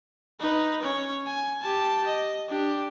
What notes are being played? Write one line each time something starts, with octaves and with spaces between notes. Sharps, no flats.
D#4 B4
C#4 C#5
G#5
G4 A5
D#5
D4 G4